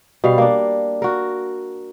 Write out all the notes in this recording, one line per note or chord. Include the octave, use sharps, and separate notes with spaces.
B2 G3 F5
A#3 D4
F#4 A#4